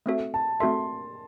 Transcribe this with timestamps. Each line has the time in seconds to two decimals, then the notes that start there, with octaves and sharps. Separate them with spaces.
0.06 A3 C4 F#4 A4 E5
0.34 A5
0.60 A3 C4 F#4 A4 E5 C6